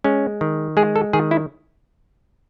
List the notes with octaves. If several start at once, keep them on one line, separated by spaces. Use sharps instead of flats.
G#3 C#4
D#3
G#3 G#4
A4
D#3 G#4
E4